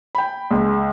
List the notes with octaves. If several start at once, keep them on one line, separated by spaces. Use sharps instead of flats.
G5 B5
C#2